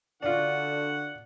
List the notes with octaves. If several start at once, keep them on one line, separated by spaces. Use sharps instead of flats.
D3 D4 F4 F#4 F#5